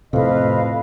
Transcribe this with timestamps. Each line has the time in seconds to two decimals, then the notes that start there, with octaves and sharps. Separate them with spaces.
0.13 F2 A2 C3 B4 D#5 F5